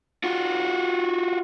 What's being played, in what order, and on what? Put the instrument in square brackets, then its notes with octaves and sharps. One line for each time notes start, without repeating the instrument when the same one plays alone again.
[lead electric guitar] F4 F#4